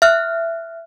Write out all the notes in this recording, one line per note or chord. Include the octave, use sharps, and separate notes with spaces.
E5 F6 F#6